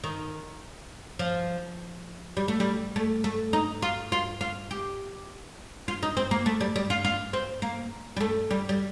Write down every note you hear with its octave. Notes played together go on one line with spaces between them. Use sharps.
D#3
F3
G3
A3
G3
A3
A3
D#4
F4
F4
F4
G4
F4
D#4
C4
A#3
A3
G3
G3
F4
F4
C4
A#3
G3
A3
G3
G3